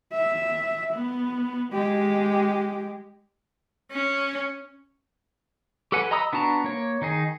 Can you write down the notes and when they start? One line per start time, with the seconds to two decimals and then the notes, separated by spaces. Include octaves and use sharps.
0.13 E5
0.94 B3
1.73 G#3 G4
3.91 C#4
5.92 G4 A4 B4 F#5 G#5
6.11 D#5 A#5 B5 D#6 E6
6.33 B3 D4 F#4 A5 A#5
6.64 A#3 C#5
7.02 D#3 D#4 G#4